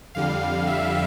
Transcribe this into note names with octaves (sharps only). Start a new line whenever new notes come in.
F2 D3 G3 F5
E5